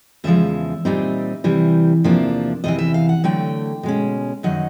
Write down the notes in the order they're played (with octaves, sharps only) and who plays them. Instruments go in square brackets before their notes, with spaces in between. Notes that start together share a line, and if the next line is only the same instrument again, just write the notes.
[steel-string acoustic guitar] E2 C#3 F3 G#3 E5
A#2 G3 C4 D#4
C3 E3 G3
E2 C3 F3 A#3 D4
E2 C3 E3 D#5
E5
F5
F#5
D3 F#3 A3 G5
B2 G#3 C#4
F#2 D#3 F#3 D#4 F#5